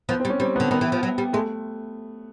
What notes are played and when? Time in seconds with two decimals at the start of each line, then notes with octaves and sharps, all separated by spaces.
0.09 F3 B3
0.20 C4
0.25 G3
0.30 C#4
0.40 G3 C4
0.56 B3
0.60 D3
0.71 D#3 B3
0.81 E3
0.92 F3
1.03 F#3
1.18 G3
1.33 G#3 A3